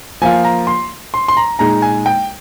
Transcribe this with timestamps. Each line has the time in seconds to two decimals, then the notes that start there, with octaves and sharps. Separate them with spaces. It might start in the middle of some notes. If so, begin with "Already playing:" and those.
0.21 F3 A#3 F4 G#5
0.44 A#5
0.67 C6
1.14 C6
1.28 C6
1.37 A#5
1.59 A#2 G#3 D#4 A#5
1.82 G#5
2.06 G5